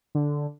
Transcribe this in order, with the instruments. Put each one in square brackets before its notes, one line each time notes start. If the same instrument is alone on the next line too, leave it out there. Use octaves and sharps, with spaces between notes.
[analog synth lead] D3